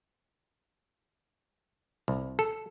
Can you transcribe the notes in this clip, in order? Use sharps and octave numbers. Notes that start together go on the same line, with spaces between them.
C2
A4